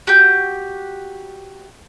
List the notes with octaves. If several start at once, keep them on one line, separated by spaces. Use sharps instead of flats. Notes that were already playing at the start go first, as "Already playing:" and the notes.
F#4 G4 G6